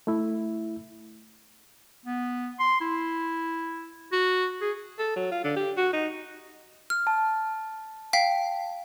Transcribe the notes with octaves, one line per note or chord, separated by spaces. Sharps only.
A3 E4
B3
C6
E4
F#4
G#4
A4
F#3
F4
D3
G4
F#4
D#4
F6
A5
F5 G5 B6